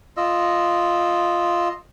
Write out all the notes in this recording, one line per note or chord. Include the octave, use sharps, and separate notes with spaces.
F4 D#5 E6